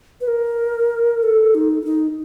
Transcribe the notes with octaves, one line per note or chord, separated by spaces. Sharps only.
B4
A#4
A4
D#4
E4
D#4